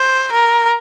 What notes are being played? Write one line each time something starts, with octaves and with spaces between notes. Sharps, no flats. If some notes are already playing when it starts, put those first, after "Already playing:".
Already playing: C5
A#4